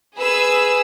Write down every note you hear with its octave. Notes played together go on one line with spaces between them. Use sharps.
G#4 B4 E6